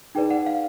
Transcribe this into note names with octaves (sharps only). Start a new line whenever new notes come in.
D#4 G#4 B4 D5 G5
F#5
F5